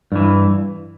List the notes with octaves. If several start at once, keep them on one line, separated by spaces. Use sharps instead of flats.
G2 E3